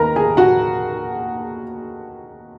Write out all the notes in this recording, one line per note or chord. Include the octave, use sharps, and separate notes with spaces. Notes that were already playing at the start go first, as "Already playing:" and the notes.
Already playing: D#2 D#3 A#4 B4 A#5
G#4 G#5
F#4 F#5